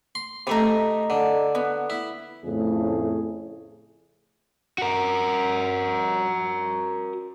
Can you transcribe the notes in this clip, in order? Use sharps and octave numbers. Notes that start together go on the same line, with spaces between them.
C6
C3 A3 D#4 B5
D3
B3
E4
F2 A2 C#3 A3 G#4
F#4 A#4